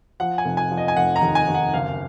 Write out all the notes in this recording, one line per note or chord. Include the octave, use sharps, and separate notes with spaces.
F3 F#5
G#5
F1
G#5
F3
D#5
G#5
F1 F#5
A#5
D#2
G#5
D#2
F#5
F#1 F5